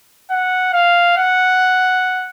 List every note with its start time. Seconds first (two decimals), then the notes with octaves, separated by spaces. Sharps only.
0.30 F#5
0.73 F5
1.17 F#5